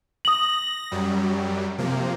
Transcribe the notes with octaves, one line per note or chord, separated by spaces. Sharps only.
D#6 A#6 F#7
F#2 F#3 G3
C3 F3 A#3